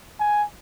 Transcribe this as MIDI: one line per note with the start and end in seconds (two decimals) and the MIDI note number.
0.20 0.44 80